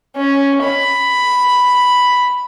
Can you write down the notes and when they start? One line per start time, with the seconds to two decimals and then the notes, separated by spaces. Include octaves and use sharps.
0.16 C#4
0.65 B5